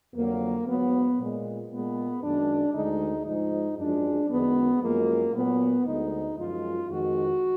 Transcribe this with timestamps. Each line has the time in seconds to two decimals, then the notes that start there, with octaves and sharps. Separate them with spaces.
0.15 F2 D3 F#3 A#3
0.66 G#2 F#3 B3
1.19 A#2 G#3
1.70 A#2 G#3 B3
2.22 F#2 D#3 G#3 D4
2.74 D2 D3 G#3 D#4
3.26 G#2 F3 G#3 D#4
3.77 F#2 F3 G#3 D4
4.29 F#2 D#3 G#3 B3
4.81 F#2 F3 G#3 A#3
5.33 A#2 F#3 B3
5.85 D2 D3 G#3 D#4
6.37 F#2 F3 G#3 F4
6.89 F2 D#3 G#3 F#4